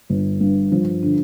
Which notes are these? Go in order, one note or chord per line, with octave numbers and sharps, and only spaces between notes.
G1
G2
F3
D3